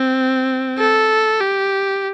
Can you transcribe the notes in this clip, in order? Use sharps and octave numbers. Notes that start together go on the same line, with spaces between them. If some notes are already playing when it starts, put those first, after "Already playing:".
Already playing: C4
A4
G4